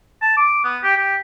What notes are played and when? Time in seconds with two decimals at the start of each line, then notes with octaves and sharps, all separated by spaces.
0.21 A5
0.37 D6
0.64 B3
0.83 G4
0.97 G4